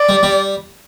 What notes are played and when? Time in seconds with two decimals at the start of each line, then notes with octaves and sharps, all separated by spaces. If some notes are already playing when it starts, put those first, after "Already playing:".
Already playing: D5
0.09 G3
0.23 G3